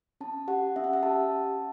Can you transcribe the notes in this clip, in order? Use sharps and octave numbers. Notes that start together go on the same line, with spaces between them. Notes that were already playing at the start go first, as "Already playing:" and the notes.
C#4 A5
G4 F#5
C#4 E5
F#5
E5
G4 A5
C#4